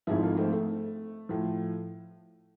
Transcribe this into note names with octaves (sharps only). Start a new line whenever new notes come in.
G#1 G#2 F3 E4 G#4
F4 A4
A3 C4
A3
A2 F3